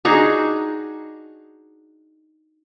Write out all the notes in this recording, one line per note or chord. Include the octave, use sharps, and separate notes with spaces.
D4 D#4 F#4 G#4